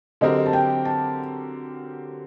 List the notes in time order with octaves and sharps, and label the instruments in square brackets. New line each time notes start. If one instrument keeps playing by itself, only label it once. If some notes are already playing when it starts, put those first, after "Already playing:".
[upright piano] D3 F#3 C4 G4 A#4 [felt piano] D#5
[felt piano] A5
G5
A5